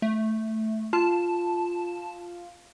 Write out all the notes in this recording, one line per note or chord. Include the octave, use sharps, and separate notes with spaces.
A3
F4 A5